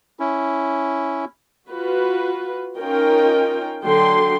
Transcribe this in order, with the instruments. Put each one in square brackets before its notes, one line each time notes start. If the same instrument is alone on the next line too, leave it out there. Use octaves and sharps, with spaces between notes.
[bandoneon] C#4 E4
[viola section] F4 F#4 B4
C#4 D#4 F4 A#4 G5
D3 F#3 G5 C6